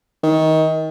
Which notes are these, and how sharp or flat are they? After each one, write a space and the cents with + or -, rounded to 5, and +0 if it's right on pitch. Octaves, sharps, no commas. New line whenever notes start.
D#3 +25